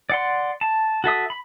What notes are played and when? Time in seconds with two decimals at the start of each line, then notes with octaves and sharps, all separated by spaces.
0.10 D5 F#5 C6
0.61 A5
1.04 F#4 A4 E5 D#6
1.30 B5